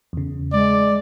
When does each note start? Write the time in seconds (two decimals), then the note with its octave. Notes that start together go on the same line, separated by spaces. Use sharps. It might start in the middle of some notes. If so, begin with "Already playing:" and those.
0.13 E2 C#3
0.53 G#3 D5